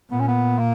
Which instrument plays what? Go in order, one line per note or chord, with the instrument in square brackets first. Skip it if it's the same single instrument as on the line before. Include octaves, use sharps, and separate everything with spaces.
[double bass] A#2 [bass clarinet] B3
[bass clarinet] C#4
B3
A#3